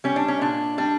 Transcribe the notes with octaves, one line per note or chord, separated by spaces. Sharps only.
G3 C#4
D4
C#4
A#2 D4
G3 D4